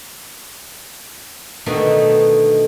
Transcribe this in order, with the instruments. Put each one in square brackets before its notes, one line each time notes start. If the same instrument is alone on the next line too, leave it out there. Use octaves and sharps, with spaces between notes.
[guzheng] B2 D3 D#3 A3